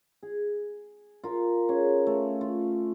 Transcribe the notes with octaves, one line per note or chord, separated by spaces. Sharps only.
G#4
F4 A#4
C#4 G#4
A3
F4